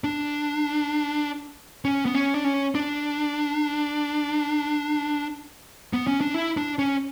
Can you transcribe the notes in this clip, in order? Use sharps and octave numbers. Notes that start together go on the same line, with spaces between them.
D4
C#4
B3
C#4
D4
C#4
D4
B3
C#4
D4
E4
D4
C#4